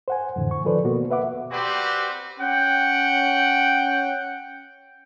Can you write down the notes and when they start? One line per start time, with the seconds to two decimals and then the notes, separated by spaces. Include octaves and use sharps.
0.08 C5 F#5 G#5
0.36 F2 A2 D3 E3
0.51 C#6
0.65 D#3 F3 A4 B4 C5 D5
0.84 B2 A#3 B3 F#4
1.11 B4 E5 F#5 D6
1.52 C4 F#4 G4 B4 D5 C6
2.40 C#4 F#5 G5